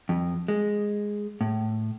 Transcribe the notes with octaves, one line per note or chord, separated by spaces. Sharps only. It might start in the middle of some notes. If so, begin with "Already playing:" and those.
F2
G#3
A2